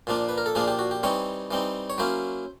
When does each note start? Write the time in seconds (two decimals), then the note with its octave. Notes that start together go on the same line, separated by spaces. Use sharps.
0.07 A#2 F3 A#3 D4
0.29 B4
0.38 A#4
0.46 A4
0.55 A#2 F3 A#3 D4 G#4
0.67 G4
0.79 F#4
0.91 G4
1.03 E3 G3 C4 D#4 C#5
1.51 E3 G3 C4 D#4
1.90 C#5
1.98 F#3 A#3 C#4 E4 C5